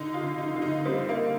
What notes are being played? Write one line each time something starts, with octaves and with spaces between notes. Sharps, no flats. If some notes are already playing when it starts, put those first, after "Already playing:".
Already playing: D3 D#4
F4
D3
D#4
D3 F4
D#4
G3 C4
A#3